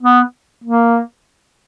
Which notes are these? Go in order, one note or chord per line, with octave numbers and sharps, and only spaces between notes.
B3
A#3